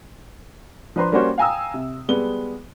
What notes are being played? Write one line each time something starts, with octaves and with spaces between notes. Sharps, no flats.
F3 D4 B4 C5 A#5 C6
G3 A#3 C#4 F#4 C5 C#5
F5 G5 G#5 A#5 D#6 E6
C3
G3 G#3 B3 G7